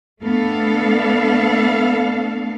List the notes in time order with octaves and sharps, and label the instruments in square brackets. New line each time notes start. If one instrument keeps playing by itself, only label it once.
[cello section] A3 B3 D4 A4 F5